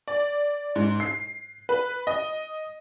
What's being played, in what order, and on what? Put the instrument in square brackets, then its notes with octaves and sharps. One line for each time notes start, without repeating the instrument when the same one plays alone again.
[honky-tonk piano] D5
G#2
C7
B4
D#5